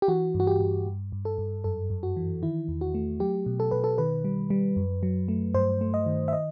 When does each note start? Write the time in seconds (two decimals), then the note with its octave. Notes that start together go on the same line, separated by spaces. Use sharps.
0.02 G4
0.08 E3 F#4
0.35 G2
0.40 F#4
0.47 G4
0.60 G2
0.86 G2
1.12 G2
1.25 A4
1.38 G2
1.64 F#2 A4
1.90 F#2
2.03 F#4
2.17 E3
2.42 D#3 E4
2.68 E2
2.81 F#4
2.94 A3
3.20 F#3 G4
3.46 B2
3.60 A4
3.71 B2 B4
3.84 A4
3.98 D#3 B4
4.25 G3
4.50 G3
4.76 F#2
5.03 F#3
5.28 A3
5.54 G2 C5
5.81 A3
5.94 D#5
6.06 D#3
6.28 E5
6.33 D#5